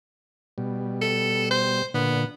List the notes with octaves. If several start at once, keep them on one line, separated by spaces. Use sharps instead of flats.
B2 G3
A4
C5
A#2 D3 B3